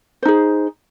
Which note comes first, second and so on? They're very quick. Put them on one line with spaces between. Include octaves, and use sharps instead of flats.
C5 D#4 G#4